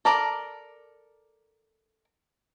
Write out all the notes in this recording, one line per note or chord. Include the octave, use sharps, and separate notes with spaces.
A4 A#4 D5